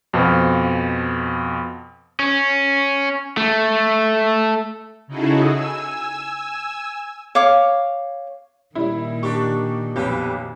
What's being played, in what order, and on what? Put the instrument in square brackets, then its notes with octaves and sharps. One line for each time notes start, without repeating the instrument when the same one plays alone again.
[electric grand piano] F2 B2 F3
[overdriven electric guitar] C#4
A3
[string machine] C#3 D#4 E4 F#4 G#4 A4
G#5 E6
[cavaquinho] C#5 F5 D6
[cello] A#2 D#3 [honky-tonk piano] G3 E4
[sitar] D4 G4 [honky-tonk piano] C#6
[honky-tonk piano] B1 F2 G6 [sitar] B3 G4